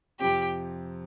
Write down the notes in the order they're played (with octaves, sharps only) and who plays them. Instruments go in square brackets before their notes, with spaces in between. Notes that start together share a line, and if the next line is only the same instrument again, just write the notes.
[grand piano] F2 C3 F3 C4 [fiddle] G4